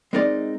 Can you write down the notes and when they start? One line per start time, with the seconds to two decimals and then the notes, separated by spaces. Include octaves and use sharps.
0.13 G#3 C4 D#4 A#4 D5